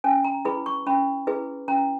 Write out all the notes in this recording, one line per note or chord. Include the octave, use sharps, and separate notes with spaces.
C#4 G#5
A#5
E4 G#4 B4 B5
C#6
C#4 B5
E4 G#4 B4
C#4 A#5